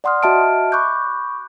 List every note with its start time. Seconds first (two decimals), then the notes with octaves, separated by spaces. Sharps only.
0.04 D5 F#5 C6 D#6 F6
0.23 F#4 D#5 E5 A5 F6 D7
0.72 B5 C#6 D6 F#6 G6